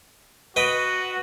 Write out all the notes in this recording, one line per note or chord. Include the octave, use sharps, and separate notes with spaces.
F#4 B4 D#5 G5